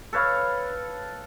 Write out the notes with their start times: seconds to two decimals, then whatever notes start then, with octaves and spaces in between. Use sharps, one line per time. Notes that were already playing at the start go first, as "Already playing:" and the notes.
0.13 A4 B4 C#5 F5